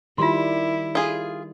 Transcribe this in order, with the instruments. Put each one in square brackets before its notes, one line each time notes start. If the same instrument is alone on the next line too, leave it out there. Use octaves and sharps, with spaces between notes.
[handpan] D#3 G3 [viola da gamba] E4 [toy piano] F4 C6
[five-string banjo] F4 G#4 [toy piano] A4